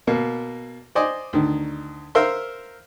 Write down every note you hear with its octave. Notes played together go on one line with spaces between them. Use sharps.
B2 A#3
C5 D5 D#5 G#5
D2 D#3
A#4 C5 E5 F5 C6